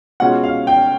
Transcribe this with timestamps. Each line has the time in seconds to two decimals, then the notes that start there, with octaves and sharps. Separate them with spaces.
0.20 B2 G#3 C#4 F4 F#5
0.44 F5
0.67 G5